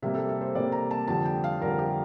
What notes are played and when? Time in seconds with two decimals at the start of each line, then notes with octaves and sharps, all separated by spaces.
0.03 C3 G3 A#3 E5
0.15 A4
0.29 A4
0.41 C5
0.55 C3 G3 A#3 D5
0.72 A#5
0.91 A5
1.08 F2 D3 G3 A5
1.25 G5
1.44 F5
1.61 F2 D3 G3 A#4
1.79 G4